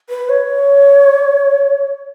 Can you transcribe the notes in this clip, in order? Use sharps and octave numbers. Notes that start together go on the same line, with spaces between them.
B4
C#5